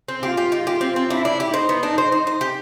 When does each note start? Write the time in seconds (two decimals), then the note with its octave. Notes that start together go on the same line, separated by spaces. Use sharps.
0.08 C4
0.22 F4 G4
0.37 G4
0.52 D#4
0.67 F4 G4
0.81 C4
0.96 C4
1.10 D4 E4
1.25 D4
1.40 G4
1.54 D#4 C5
1.69 B3
1.83 D4
1.98 C5
2.12 C5
2.27 C5
2.41 G4